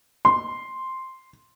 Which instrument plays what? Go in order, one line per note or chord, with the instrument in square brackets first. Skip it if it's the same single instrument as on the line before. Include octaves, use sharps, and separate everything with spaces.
[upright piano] C6